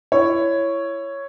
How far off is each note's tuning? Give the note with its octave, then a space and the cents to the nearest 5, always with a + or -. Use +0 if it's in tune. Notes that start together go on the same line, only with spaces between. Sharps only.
E4 +25 C#5 +0